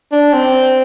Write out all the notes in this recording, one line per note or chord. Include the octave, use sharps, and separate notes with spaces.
D4
C4